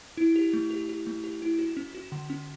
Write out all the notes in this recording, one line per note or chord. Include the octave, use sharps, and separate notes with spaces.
E4
G4
A3
G4
G4
A3
G4
E4
F#4
C#4
F#4
D3
C#4